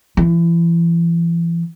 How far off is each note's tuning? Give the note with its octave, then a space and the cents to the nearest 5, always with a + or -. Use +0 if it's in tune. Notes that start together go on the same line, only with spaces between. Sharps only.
E3 +35